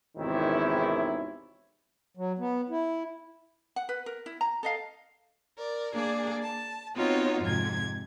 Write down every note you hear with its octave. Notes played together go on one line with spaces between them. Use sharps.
G#1 E2 C3 D#3 C#4 E4
F#3
B3
E4
F#5
B4
A#4
E4
A#5
A4 D#5 F5
A#4 D5
A#3 D4 G#4 D5
A5
B3 C4 D#4 F4 F#4 C#5
F2 G#2 C3 G#6